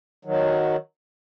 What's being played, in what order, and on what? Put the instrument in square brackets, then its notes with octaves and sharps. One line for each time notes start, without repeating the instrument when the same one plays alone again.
[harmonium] D#3 F#3